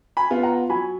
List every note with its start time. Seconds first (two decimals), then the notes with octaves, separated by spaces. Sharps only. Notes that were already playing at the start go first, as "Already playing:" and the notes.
0.17 G#5 B5
0.31 B3 F4
0.43 F#5 A#5
0.69 F#3 G#5 B5